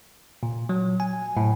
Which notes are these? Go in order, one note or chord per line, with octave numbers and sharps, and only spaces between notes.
A#2
F#3
G#5
A2